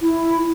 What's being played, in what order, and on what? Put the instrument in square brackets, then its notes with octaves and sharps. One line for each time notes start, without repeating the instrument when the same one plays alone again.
[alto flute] E4